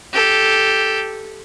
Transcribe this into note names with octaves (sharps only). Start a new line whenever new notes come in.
G4 A4